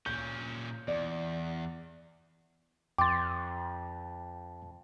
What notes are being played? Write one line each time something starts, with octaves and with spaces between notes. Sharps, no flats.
A#2 C#4 G6
E2 D5
F2 G5 C6 D6 A6